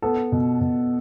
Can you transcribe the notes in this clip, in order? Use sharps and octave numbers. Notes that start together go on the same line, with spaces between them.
B3 A4
B2
B2